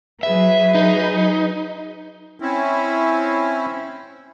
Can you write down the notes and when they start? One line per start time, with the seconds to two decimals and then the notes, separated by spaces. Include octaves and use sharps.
0.23 F#3 G#4 B4 E5
0.75 D#4
2.40 C4 C#4 E4